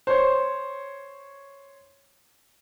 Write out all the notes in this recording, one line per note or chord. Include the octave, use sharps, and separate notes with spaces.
C5 C#5